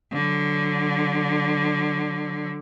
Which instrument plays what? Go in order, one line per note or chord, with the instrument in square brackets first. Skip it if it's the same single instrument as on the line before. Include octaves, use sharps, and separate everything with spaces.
[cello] D3 F#3